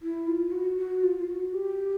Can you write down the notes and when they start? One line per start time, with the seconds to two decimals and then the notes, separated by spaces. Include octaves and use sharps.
0.02 E4
0.27 F4
0.51 F#4
0.77 F#4
1.03 F4
1.18 F4
1.27 F#4
1.54 G4